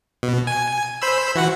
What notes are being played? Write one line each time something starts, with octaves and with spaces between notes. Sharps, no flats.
B2
G#5
C5 B5 E6
E3 F#4 F#5